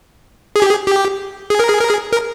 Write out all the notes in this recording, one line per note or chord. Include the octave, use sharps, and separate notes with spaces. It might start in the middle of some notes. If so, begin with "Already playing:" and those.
G#4
G4
G#4
G4
G#4
A#4
G#4
A#4
G#4
A#4